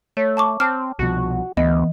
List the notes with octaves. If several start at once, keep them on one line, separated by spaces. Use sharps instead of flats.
A3 C#5
A5 C#6 D6
C4 A5 D6 F6
C2 B2 F3 F#4
D2 E3 B3 D#5